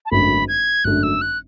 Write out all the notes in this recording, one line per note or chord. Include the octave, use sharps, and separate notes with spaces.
A5
G#1 F#2 D3 A3 D4 B5
G#6
G#1 F#2 D3 A3 D4 F#6
E6
F#6